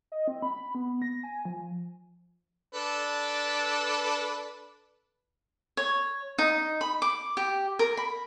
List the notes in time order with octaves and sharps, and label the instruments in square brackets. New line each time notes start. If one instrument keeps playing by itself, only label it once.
[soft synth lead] D#5
C4
B5
B3
A#6
G#5
F3
[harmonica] D4 A4 B4
[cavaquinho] C#5
D#4
B5
D6
G4
A#4
B5